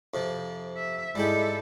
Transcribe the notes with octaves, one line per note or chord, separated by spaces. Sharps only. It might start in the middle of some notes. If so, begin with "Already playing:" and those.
F2 C3 F3
E5
G#2 G3 G#3 E4 G4 A4